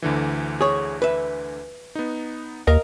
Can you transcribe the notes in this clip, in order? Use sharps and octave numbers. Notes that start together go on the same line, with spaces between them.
D2 D3 E3
G#4 C#5
B4 E5
B3 D#4
D#2 A#4 D#5 F5